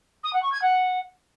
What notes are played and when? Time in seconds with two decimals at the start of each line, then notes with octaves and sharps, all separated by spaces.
0.24 D#6
0.33 F#5
0.43 C#6
0.52 G#6
0.62 F#5